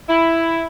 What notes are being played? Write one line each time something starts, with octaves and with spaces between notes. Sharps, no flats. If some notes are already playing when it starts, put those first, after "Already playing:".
E4